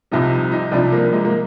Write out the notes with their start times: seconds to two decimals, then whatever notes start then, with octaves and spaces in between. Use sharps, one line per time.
0.11 C2 C3 F3 D#4
0.52 D#4
0.72 C2 C3 F3 D4
0.92 A#3
1.13 G#3
1.25 A#3